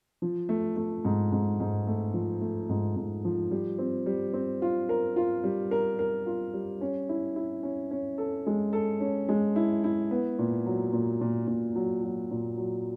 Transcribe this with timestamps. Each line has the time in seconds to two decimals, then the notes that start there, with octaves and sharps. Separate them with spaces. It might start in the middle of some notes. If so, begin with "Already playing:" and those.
0.22 F3
0.49 A3
0.76 A3
1.05 G#2
1.32 G#2
1.60 G#2
1.87 A3
2.14 F3
2.41 A3
2.69 G#2
2.96 G#2
3.25 F3
3.51 G3
3.78 C4
4.06 G3
4.33 C4
4.62 F4
4.89 A#4
5.16 F4
5.44 G3
5.71 A#4
5.99 A#4
6.26 F4
6.53 G3
6.81 C#4
7.09 E4
7.36 E4
7.63 C#4
7.91 C#4
8.18 A4
8.47 G#3
8.73 A4
9.00 C#4
9.29 G#3
9.56 E4
9.84 E4
10.11 B3
10.39 A#2
10.66 F#3
10.93 A#2
11.21 A#2
11.47 A#2
11.75 F#3
12.02 F#3
12.31 A#2
12.57 F#3